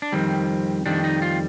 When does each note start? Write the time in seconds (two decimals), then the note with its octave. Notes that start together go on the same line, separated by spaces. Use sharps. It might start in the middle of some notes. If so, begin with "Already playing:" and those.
0.02 D4
0.12 F2 D#3 G3 C4
0.86 F2 D#3 G3 D4
1.04 D#4
1.22 F4